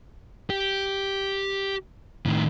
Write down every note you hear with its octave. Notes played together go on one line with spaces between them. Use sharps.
G4
A2 D#3